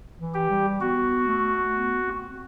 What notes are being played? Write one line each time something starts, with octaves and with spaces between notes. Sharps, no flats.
E3
G4
G3
B3 F#4
A3
B3
C4